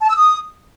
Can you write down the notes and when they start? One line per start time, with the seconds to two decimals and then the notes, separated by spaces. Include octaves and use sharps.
0.02 A5
0.09 E6
0.16 D#6